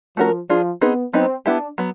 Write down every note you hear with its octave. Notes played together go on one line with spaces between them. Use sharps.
F3 A3 C#4 F#4 A#4
F3 D4 F4 G#4
B3 C4 D#4 G#4 B4
F#3 B3 C4 D#4
B3 D4 E4 G4
F#3 B3